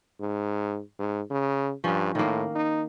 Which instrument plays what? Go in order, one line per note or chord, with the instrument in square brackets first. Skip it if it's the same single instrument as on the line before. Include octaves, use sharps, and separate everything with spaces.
[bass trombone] G#2
G#2
C#3
[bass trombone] G2 [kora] F3 C#4
[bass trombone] A2 [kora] D#3 A#3
[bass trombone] D#4